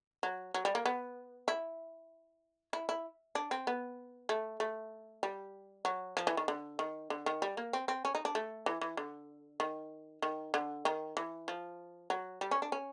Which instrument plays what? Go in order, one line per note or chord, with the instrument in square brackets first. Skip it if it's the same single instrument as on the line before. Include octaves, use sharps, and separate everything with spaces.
[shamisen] F#3
F#3
G3
A#3
B3
E4
E4
E4
D4
C4
B3
A3
A3
G3
F#3
F3
E3
D#3
D3
D#3
D3
D#3
G3
A#3
C4
C4
C#4
D#4
D4
A3
E3
E3
D3
D#3
D#3
D3
D#3
E3
F3
F#3
G3
C#4
D4
C#4